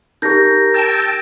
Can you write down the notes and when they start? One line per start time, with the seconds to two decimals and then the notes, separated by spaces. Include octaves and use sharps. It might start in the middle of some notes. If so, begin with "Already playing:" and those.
0.22 D#4 G4 A#4 G6 A#6
0.74 G5 A5 E6